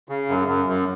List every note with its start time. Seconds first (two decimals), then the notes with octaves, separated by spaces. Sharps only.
0.09 C#3
0.29 F#2
0.48 F#2
0.68 F#2